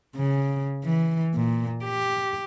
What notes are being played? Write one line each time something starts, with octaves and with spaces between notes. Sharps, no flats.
C#3
E3
A#2
G4